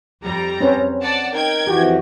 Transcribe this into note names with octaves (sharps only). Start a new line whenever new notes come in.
F2 G3 A#5
C4 C#4 B4
D5 F#5 A5
D#4 A#4 G5 G#6
F2 E3 F#4 G4